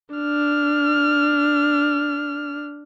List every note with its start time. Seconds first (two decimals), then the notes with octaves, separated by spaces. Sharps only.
0.15 D4 F6